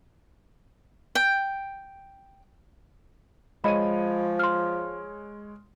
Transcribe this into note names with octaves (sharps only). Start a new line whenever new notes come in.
G5
F3 G#3 C#5 D#5 B5 D#7
C6 F6